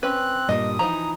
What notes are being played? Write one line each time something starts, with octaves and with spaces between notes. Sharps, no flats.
C4 C#4 B4 F#6
G2 A#2 G3 D#5 D#6
E3 F3 D#4 C5 A#5